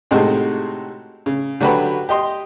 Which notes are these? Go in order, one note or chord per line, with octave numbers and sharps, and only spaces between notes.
A2 C3 G#3 C4 D#4 F#4
C#3
D3 F#3 D4 F#4 G4 B4
G4 D#5 C6